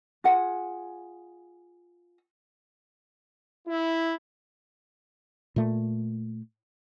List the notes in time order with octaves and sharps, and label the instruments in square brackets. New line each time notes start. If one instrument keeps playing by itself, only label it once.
[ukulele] F4 G#4 F#5
[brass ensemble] E4
[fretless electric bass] A#2 A3